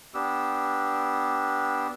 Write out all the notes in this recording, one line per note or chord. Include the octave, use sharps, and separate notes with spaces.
B3 D4 G4 E6